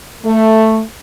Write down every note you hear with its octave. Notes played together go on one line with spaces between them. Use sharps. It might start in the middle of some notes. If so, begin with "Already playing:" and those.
A3